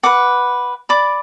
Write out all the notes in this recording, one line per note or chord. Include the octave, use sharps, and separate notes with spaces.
B4 F#5 D6
D5 B5 D6